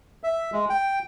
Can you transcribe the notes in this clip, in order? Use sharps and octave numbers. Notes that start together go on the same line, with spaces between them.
E5
G#3
G5